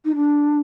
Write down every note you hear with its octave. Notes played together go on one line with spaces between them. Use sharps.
D#4
D4